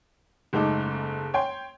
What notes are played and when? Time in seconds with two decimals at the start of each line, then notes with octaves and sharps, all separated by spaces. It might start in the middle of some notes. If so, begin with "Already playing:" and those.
0.53 F#1 G#2 A3 D#4 A4 D6
1.34 C#5 G5 C6